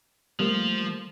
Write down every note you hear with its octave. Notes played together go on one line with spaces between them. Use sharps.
F3 G3 A3 A#3 F4